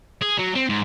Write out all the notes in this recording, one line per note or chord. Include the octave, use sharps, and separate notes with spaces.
G#4
F#3
C4
G#2